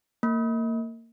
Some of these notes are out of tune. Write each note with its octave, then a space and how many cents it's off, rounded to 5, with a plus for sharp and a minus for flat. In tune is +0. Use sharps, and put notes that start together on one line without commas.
A#3 -25